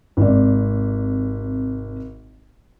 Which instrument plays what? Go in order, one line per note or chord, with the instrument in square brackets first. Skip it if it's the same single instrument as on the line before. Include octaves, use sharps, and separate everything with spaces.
[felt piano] G#1 C3 D5